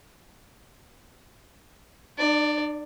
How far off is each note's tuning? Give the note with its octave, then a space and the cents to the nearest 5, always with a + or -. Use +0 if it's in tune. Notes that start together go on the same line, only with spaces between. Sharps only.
D4 +45 D5 +0